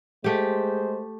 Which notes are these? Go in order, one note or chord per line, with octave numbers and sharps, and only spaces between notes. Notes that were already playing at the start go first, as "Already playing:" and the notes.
G#3 A3 G4 C5